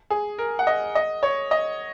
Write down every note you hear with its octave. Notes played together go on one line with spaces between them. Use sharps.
G#4
A#4
F#5
D#5
D#5
C#5
D#5